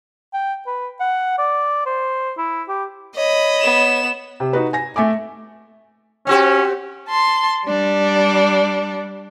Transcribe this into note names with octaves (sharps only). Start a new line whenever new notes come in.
G5
B4
F#5
D5
C5
E4
G4
C#5 D#5 B5
B3 E7
C3
D#4 F#4 B4
G#5 A#6
A3 E5 G#5 D6
C4 C#4 F#4 G4
A5 C6
G3 D4